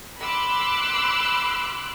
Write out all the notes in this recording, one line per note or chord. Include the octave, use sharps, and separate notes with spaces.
B5 C6 D6 E6 F#6